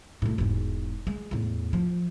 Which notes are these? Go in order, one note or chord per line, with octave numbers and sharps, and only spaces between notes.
E1 A2
E1 G#2
G#3
E2 A2
F3